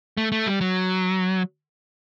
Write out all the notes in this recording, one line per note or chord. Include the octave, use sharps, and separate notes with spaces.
A3
A3
G3
F#3